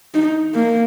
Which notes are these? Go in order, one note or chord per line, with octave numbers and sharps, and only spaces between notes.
D#4
A#3